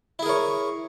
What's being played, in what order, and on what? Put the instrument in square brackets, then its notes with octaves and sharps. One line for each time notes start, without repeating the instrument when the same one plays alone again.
[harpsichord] E4
G#4
A#4
C#5